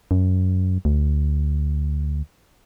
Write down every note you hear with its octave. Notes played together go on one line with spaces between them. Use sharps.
F#2
D2